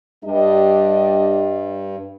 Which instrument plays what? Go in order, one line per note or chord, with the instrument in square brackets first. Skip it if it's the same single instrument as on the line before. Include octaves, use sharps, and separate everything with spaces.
[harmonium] G2 [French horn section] G3 D4 D#5